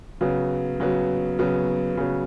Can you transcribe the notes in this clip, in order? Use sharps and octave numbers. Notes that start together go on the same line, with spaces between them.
C#3 F#3 B3
C#3 F#3 B3
C#3 F#3 B3
C#3 F#3 B3